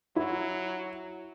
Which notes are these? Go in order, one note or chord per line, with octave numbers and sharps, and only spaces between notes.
F#3 E4